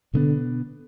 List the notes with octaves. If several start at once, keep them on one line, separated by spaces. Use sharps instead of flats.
B2 D3 G#3 B3 D4